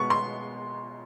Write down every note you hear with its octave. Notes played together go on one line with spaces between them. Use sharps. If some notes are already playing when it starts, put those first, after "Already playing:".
Already playing: B2 G#3 B3 C#6
C6